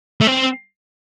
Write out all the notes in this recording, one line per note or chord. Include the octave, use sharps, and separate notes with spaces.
A3
C4